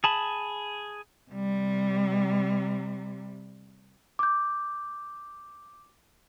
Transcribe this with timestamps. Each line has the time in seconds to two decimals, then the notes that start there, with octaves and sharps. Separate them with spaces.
0.04 G#4 A5 B5
1.31 C3 G3
4.19 D6 G6